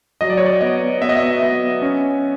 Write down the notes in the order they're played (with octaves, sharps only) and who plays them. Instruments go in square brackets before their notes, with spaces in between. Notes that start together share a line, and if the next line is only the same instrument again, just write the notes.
[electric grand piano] F#3 D#5
D5
C#5
D5
B3 D#5
B3 E5
D#5
E5
B3
C#4